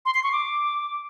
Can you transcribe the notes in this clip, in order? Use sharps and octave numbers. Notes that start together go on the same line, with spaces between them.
C6
C7
C#6
D6